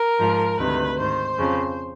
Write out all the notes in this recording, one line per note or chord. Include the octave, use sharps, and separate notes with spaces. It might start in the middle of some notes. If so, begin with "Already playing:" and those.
Already playing: A#4
G#2 F3
D2 C3 D#3 B4
G#2 D#3 C5
F2 C#3 F3